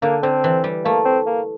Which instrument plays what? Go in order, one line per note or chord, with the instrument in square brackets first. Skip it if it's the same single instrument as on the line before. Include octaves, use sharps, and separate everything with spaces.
[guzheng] D3 [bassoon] A#3
[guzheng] D3 [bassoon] C4
[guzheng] E3
G3
[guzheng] A3 [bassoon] A#3
[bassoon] C4
A#3